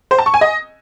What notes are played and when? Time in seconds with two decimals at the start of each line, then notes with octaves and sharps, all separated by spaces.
0.11 C5
0.19 A5
0.26 C#6
0.34 G#5
0.41 D#5